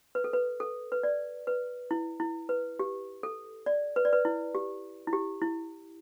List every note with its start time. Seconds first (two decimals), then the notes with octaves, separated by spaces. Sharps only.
0.15 B4
0.24 A4
0.33 B4
0.60 A4
0.92 B4
1.03 D5
1.47 B4
1.91 E4
2.20 E4
2.49 B4
2.79 G4
3.23 A4
3.66 D5
3.96 B4
4.05 D5
4.13 B4
4.25 E4
4.55 G4
5.07 E4
5.13 G4
5.42 E4